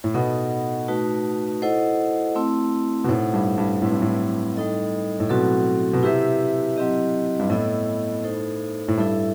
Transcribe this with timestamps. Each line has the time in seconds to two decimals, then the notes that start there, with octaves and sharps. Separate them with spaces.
0.04 A2
0.14 B2 B3 D#4 A4 D#5 F#5
0.88 A3 D#4 F#4 B4
1.62 E4 A4 C5 D#5 F#5
2.35 A3 C4 E4
3.04 B2
3.09 A2 D#4 A4 C5 F#5
3.34 G2
3.58 G2
3.82 A2 F#3 C4 E4 B4
3.92 G2
4.02 A2
4.56 G3 D#4 A4 D#5
5.20 A2
5.29 B2 F#3 C4 F#4 A4
5.93 B2
6.03 C3 E4 G4 B4 E5
6.77 F#3 C4 E4 G4 D#5
7.39 G2
7.50 A2 B3 E4 A4 D#5
8.24 D#4 A4 C5
8.88 A2
8.97 G2 E4 A4 E5